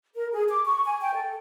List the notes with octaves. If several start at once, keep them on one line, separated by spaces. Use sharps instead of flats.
A#4
G#4
D6
C#6
G#5
G5
A4